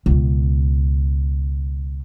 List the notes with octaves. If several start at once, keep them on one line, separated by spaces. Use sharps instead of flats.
C#2 B2